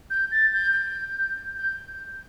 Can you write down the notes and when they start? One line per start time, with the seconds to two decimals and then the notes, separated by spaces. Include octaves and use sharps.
0.10 G6
0.31 A6
0.53 G6
0.73 G6
1.58 G6